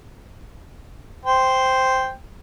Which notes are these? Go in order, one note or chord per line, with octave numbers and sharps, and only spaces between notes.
C5 G5